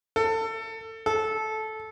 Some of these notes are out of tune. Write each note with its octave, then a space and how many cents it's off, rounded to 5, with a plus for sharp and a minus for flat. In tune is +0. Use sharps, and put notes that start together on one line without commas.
A4 +25
A4 -15